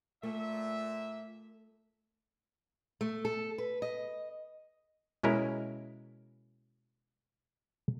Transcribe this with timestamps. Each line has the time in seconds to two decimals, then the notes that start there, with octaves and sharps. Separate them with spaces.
0.23 A#2 A3 E5
3.01 A3
3.25 A4
3.58 B4
3.82 D#5
5.23 B2 G#3 C#4 E4 A#4